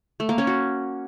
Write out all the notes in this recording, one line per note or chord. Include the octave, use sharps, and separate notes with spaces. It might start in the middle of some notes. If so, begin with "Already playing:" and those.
A3
A#3
C#4
F#4